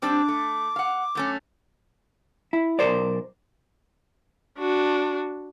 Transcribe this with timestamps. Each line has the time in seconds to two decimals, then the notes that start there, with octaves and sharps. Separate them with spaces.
0.02 G3 C4 D4 D6
0.28 A3
0.76 F5 F#5
1.15 F#2 A3 C#4
2.53 E4
2.79 B1 G#2 A#4 C5 D5
4.58 D4 F#4